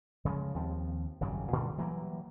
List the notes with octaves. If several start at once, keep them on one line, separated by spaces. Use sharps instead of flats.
C#3 F3 G#3
D#2 F3 C4
G#1 F#2 C#3 G3
A#2 D3 F3 G3
E3 F#3 G3 A#3